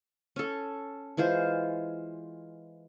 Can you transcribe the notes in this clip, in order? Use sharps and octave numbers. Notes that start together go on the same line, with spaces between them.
C#4 A4
E3 G#3 F4 C5